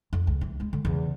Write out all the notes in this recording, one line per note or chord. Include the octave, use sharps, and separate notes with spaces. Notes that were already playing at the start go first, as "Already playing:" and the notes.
F2
C#2
E3
G#3 E4
D3
E2 C#3